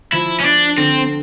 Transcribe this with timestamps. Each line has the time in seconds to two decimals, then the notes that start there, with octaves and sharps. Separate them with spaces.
0.12 F3 E4
0.40 C#4
0.44 F3 D4
0.77 D3 C4